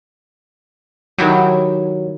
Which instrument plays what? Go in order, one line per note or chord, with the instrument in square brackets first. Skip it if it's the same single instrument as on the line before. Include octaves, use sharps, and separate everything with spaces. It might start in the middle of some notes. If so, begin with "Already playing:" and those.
[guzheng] D#3 E4 G4 [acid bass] F#3